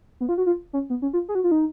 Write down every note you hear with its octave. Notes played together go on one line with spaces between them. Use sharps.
B3
F4
F#4
F4
C#4
B3
C#4
F4
G#4
F#4
F4
D#4